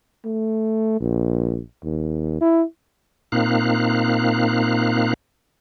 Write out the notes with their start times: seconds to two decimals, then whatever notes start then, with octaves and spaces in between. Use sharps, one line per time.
0.25 A3
1.00 A#1
1.84 D#2
2.41 E4
3.32 A#2 A#3 C4 D#4 F5 F#6